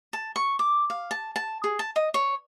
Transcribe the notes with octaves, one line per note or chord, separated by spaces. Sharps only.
A5
C#6
D6
F5
A5
A5
G#4
A5
D#5
C#5